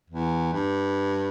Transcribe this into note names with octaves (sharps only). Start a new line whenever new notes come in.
E2
G2